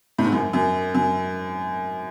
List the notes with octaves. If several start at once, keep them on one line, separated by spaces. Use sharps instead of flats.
A2
G#2
F#2
F#2
F#2